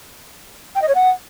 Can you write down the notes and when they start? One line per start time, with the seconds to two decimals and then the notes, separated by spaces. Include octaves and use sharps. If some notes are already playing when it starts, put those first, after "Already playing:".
0.75 G5
0.81 D#5
0.88 C#5
0.94 F#5